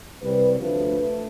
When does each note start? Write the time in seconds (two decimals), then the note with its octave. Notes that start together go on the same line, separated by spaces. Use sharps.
0.21 C2 C3 G3 B4
0.60 D2 D3 F3 A3 B4
0.99 A3